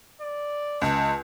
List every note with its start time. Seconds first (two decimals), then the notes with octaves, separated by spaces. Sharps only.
0.22 D5
0.82 C#2 A5